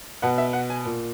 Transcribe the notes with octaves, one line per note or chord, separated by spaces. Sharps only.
B2 F#5
E5
F#5
G#5
A#2